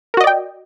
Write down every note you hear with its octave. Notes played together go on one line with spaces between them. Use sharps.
F#4 A#4 D5 D#5 G5